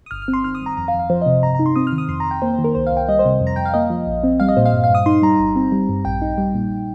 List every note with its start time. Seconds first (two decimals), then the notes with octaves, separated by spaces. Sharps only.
0.06 D#6
0.11 G1 F6
0.22 F6
0.28 C4
0.33 C6
0.44 D#3 F6
0.55 D#6
0.61 G2
0.66 A#5
0.77 F2 A#5
0.88 F5
0.94 F2
0.99 F5
1.10 F3 C5
1.22 C3 D#5
1.43 G2 A#5
1.55 D#4 A#5
1.66 C6
1.76 C4 D#6
1.87 F6
1.92 D#3
1.98 D#6
2.09 F2 C6
2.20 A#5
2.26 F2 G5
2.42 A#3 C5
2.53 C5
2.59 D#3
2.64 A#4
2.75 C2 C5
2.87 F5
2.92 C2
2.97 G5
3.08 G3 D#5
3.19 C5
3.25 C3
3.41 F2
3.47 A#5
3.56 F2 G5
3.65 F5
3.74 A#3 D#5
3.90 F3
4.07 A#1
4.23 C4
4.40 G3 F5
4.49 D#5
4.57 A#2 C5
4.66 F5
4.74 G2
4.84 F5
4.90 G2 D#6
5.06 D#4 C6
5.22 G3 A#5
5.39 G1
5.56 C4
5.72 G3
5.89 G2
6.05 A#1 G5
6.22 D#4
6.38 G3
6.55 A#2